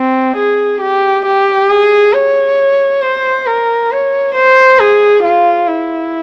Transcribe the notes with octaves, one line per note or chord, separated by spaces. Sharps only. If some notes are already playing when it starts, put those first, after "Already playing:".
Already playing: C4
G#4
G4
G4
G#4
C#5
C5
A#4
C#5
C5
G#4
F4
E4